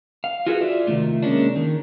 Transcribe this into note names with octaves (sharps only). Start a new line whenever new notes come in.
F5
F4 F#4 G#4 A4 B4
F4 D5 E5
C3 D#3 A3 F4
G#3 A#3 C#4 D4
D#3